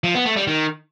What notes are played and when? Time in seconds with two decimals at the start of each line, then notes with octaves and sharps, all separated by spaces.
0.04 F3
0.15 B3
0.25 A3
0.36 G3
0.47 D#3